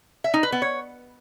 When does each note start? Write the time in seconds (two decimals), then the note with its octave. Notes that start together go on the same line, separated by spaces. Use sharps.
0.24 E5
0.34 D#4
0.43 B4
0.52 B3
0.62 C#5